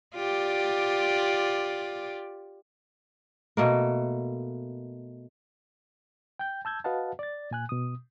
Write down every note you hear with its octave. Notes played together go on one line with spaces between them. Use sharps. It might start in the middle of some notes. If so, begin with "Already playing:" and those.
F4 G4 D5
B2 A3 A#3
G5 G6
A5 E6 G6 G#6
F#4 B4 D#5 F5 F#5 A5
D5 A6
A#2 G#5 F#6
B2 D#6